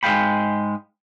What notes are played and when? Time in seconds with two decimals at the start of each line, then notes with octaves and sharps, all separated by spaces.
0.03 G#2 G#3 A4 F5 G5 B5